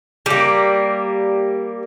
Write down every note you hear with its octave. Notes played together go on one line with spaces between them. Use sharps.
G3 A#3